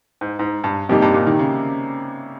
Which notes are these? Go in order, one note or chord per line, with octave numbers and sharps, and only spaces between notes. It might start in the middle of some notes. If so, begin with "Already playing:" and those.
G#2
G#2
G2
F2 C3 G3 A#3 D#4 G4
G2
A#2
D#3
C#3